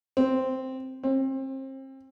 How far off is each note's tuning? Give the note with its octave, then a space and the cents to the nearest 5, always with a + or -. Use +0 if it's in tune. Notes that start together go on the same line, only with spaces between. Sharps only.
C4 +0
C4 +35